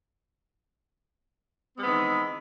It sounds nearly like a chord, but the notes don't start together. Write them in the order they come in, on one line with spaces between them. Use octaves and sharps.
C4 G#3 B3 E3 D#3